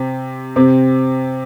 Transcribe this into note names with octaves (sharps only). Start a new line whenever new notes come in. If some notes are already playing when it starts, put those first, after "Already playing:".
Already playing: C3 C4
C3 C4